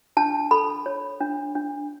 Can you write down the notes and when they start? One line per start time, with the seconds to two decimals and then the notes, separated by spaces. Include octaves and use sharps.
0.17 D4 A5
0.51 A4 B5
0.86 C#5
1.20 D4
1.55 D4